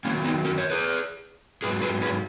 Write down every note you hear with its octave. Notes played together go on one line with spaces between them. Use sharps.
E2 D#3 F#3 A#3 C#4
B3 D#4
F#4 A#4
A#4 C#5
G#4 B4
G#2 F#3 G#4 B4
G#4 B4
G#4 B4